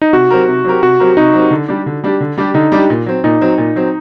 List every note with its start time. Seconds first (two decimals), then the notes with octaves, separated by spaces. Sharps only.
0.02 D#4
0.13 C3 F#4
0.30 F#3 C4 G4 A#4
0.48 C3
0.64 F#3 C4 G4 A#4
0.82 C3 F#4
1.00 F#3 C4 G4 A#4
1.17 C3 D#4
1.33 F#3 C4 G4 A#4
1.51 D3
1.68 G3 D4 G4
1.86 D3
2.04 G3 D4 G4
2.20 D3
2.38 G3 D4 G4
2.54 D3 D#4
2.72 G3 D4 G4
2.90 A#2
3.06 F#3 C4
3.24 A#2 D#4
3.41 F#3 C4
3.58 A#2
3.76 F#3 C4